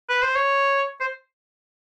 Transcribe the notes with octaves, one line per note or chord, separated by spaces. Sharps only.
B4
C5
C#5
C5